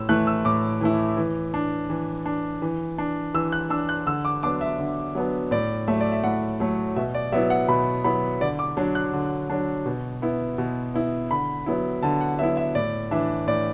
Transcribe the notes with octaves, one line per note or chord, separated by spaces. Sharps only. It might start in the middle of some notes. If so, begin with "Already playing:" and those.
Already playing: A2 E6
E3 A3 E4 F#6
E6
A2 D6
E3 A3 E4
E3
D4
E3
D4
E3
D4
E3 E6
F#6
D4 E6
F#6
D3 E6
D6
F#3 B3 D4 D6
E5
D3
F#3 B3 D4
A2 D5
F#3 A3 E5
D5
E5
A2 F#5
F#3 A3
B2 E5
D5
F#3 B3 E4 E5
F#5
B2 B5
F#3 B3 E4 B5
D3 D5
D6
F#3 D4
F#6
D3
F#3 D4
B2
B3 E4
B2
B3 E4
D3 B5
F#3 B3 E4
D3 A5
F#5
F#3 B3 E4 E5
E5
A2 D5
E3 D4 E5
A2 D5